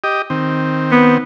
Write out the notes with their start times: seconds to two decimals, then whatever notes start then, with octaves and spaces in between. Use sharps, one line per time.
0.04 G4 D#5
0.30 D#3 C4
0.92 B3